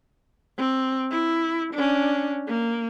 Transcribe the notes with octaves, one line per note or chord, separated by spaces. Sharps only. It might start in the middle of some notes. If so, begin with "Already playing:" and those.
C4
E4
C#4 D4
A#3